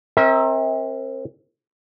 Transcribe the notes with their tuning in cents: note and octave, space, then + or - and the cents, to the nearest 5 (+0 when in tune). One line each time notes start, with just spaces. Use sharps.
C4 +30 A#4 +0 E5 -40